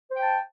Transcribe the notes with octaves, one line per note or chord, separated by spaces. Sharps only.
C5 G5 A5